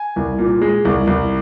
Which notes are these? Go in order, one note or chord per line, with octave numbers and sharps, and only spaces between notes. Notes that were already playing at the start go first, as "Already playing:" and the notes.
Already playing: G#5
C2
A#2
G#3
C2
C2